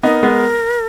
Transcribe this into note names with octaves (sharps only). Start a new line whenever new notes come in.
B3 D#4 A#4
G#3 B3